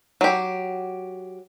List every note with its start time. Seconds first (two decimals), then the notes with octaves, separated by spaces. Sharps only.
0.21 F#3 G4